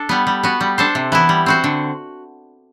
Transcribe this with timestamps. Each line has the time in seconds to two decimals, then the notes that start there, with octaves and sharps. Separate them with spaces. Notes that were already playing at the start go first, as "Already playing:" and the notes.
Already playing: D4 A4
0.09 G3 B3
0.27 G3
0.43 B3 F#4
0.61 G3
0.78 D4 A4 C5
0.95 C3
1.12 E3 B3 E4
1.29 G3
1.46 C4 F#4 C5
1.64 D3